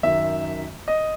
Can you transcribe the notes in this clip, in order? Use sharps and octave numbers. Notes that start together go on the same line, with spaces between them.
F#2 D#3 E5
D#5